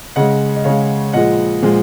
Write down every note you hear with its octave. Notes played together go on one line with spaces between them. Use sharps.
C#3 G#3 D#5 F#5
D#5
C#3 G#3 C#5 F5
A#2 F3 G#3 D#5 F#5
A#2 F3 G#3